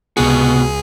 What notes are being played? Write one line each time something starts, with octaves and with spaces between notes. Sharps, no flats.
C#2 C3 B3 F#4 G#4